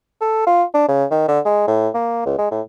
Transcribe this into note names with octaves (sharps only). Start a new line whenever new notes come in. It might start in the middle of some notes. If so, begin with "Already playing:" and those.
A4
F4
D4
C#3
D#3
D3
G#3
A2
A#3
C#2
G#3
A2